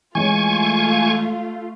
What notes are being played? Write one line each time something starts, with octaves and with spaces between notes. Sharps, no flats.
E3 G#3 A3 F4 C#5 G#5 C#6